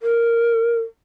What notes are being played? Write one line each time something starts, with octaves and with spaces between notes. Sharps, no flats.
A#4